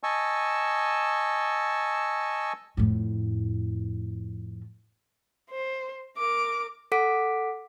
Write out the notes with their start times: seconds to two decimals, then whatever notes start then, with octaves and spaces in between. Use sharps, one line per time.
0.03 D#5 G#5 A5 C#6 E6
2.77 F2 A2
5.51 C5
6.17 A#4 D6
6.92 A4 F#5 D6 B6 D7